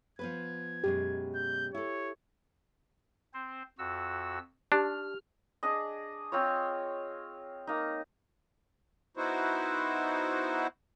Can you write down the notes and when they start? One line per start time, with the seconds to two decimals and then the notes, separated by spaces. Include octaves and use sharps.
0.19 F3 B3 B4 G#6
0.84 F#2 B2 G#3 G4
1.35 G6
1.74 E4 A4 C#5
3.34 C4 C5
3.78 F2 F#4 E6
4.72 D4 D#4 G4 F6
5.63 D4 G#4 D#5
6.32 C4 F4 C#5
7.67 A#3 D#4
9.17 B3 D#4 E4 F#4 C5